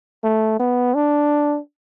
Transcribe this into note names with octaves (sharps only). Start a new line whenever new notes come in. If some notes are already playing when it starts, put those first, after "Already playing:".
A3
B3
D4